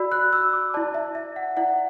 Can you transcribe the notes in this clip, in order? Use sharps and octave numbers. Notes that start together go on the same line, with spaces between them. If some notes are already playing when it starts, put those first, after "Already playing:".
Already playing: F#4 D5 B5 E6
F#6
E6
D6
E4 D5 A5
E5
E5
F#5
E4 D5 F#5